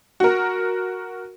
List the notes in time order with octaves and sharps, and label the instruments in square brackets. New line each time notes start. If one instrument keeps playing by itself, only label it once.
[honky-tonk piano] F#4 A#4